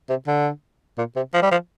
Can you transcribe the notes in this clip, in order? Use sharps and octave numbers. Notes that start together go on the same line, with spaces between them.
C3
D3
A#2
C3
F3
G3
F3